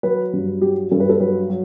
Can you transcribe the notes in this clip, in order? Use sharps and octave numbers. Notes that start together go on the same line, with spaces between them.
F#3 B4
G2
F#3 G4
G2 A4
B4
A4
F#3 B4
F#3